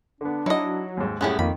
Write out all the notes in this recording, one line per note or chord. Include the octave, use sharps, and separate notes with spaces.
D3 B3 D4
F#3 D#4 E4 D#5
D#2 G#2
F#2 A2 G3 B3 C#4 E4 G#4
F2 D#3 A#3 D#4 F4 B5